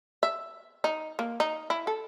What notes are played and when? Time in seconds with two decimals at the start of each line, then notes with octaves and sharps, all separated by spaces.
0.23 E5
0.84 D#4
1.19 A#3
1.40 D#4
1.70 E4
1.87 A4